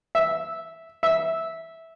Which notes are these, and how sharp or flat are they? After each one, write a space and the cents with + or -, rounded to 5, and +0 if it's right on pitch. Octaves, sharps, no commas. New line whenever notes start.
E5 -5
E5 -10